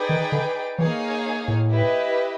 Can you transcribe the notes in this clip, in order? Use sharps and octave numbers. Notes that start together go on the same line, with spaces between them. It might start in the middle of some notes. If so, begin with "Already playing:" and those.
Already playing: D#4 G#4 B4 D5 G5
D#3
D3
E3 A#3 D#4 G#4 C#5 F5
A2
E4 G4 B4 D#5